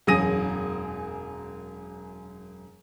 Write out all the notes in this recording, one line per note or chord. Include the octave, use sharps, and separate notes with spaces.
E1 F#2 G#4 D#6 A#6 D#7